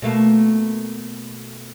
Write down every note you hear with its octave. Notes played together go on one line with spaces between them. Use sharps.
B2 A3 A#3